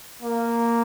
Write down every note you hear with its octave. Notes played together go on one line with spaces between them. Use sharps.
A#3